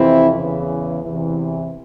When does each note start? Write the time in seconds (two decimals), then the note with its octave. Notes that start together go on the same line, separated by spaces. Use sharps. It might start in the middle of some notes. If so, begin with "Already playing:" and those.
Already playing: F2 C3 E3 C4 E4
0.35 E2 C#3 E3
1.04 E2 C3 E3